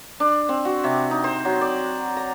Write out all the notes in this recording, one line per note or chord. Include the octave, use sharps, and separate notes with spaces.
D4
C4
F#4
C3
D#4
C5
F#3
D5
A#5